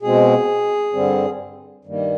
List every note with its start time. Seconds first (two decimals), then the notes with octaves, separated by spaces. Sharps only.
0.02 B2 G#3 C4 G#4
0.93 G2 D3 G3 C4
1.85 G2 D#3 G3 A#3